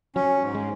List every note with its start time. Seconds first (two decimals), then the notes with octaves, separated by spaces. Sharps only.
0.16 F#3 C#4
0.42 G#2
0.55 G#3